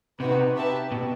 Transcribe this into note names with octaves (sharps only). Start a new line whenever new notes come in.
C3 D#4 F#4 B4
G4 B4 E5 A5
B2